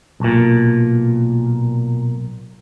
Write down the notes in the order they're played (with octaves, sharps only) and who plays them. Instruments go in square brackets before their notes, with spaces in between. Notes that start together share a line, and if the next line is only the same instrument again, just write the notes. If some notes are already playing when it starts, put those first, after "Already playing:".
[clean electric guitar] B1 A#2